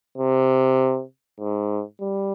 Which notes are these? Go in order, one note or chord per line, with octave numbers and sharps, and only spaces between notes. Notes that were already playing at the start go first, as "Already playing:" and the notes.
C3
G#2
G3